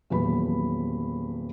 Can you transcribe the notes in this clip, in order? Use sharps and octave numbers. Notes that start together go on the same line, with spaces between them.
D#1 E2 F#3 B4 B5